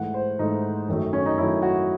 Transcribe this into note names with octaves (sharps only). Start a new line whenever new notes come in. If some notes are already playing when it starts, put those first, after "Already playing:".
Already playing: G#2 E3 A3 F#5
C5
G#2 E3 A3 D#4
F#2 D#3 F#3 A3
C#4
D#4
F#2 D#3 F#3 A3 E4
F#4